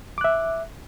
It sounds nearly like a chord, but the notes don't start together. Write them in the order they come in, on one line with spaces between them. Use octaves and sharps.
D6 F#6 E5